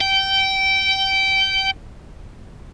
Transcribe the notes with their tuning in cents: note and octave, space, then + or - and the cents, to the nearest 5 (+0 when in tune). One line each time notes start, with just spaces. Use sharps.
G5 -20